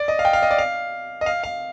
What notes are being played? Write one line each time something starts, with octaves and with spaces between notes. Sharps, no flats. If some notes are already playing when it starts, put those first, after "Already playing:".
Already playing: D5
D#5
F5
G5
F5
D#5
D5
F5
D#5
F5
F5